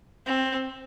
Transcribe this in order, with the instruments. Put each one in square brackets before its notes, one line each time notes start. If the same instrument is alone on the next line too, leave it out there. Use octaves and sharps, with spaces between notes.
[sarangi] C4